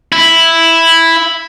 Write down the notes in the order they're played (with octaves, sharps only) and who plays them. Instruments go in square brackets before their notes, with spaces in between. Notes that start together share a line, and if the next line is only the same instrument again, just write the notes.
[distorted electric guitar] E4